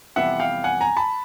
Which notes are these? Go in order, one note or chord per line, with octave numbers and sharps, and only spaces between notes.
F2 C3 E3 G3 B3 E5 F#5
F5 G5
F#5 G#5
G#5 A#5
A5 B5